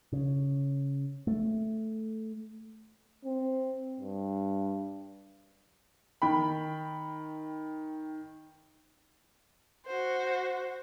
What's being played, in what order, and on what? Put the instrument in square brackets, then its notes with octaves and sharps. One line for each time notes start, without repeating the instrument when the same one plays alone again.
[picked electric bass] C#3
A3
[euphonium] C4
G2
[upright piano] D#3 G5 B5
[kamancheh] F#4 C5